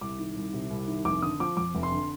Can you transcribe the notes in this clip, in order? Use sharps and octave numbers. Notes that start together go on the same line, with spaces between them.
C2 D6
D#3
C2
C3
C2
D#3
F1 D6
D3 D#6
F3 D6
F2 D6
F1
C6
D3